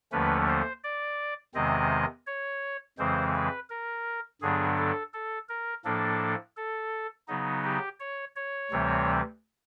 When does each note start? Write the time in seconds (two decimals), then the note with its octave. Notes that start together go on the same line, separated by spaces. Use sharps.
0.12 D#2 D3 F3 A3 C#4 B4
0.48 C5
0.84 D5
1.55 E2 C3 D#3 G#3 C4 D#5
2.26 C#5
2.98 F2 C#3 E3 G#3 C4 C5
3.35 B4
3.70 A#4
4.42 G2 D3 F#3 B3 D4 G#4
4.78 A4
5.13 A4
5.49 A#4
5.85 A2 F3 A#3 D4 A4
6.57 A4
7.28 C#3 F#3 B3 D#4
7.64 G4
7.99 C#5
8.36 C#5
8.71 D2 C3 E3 G3 C4